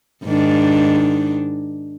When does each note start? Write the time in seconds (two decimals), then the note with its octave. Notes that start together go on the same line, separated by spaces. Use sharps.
0.25 G#2 D#3 D4